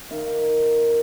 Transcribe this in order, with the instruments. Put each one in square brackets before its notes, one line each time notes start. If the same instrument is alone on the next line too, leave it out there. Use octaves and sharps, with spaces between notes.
[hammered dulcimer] D#3 F5